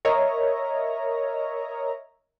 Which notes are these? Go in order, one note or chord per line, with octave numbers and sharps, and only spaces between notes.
A#4 C#5 D#5 E5 A#5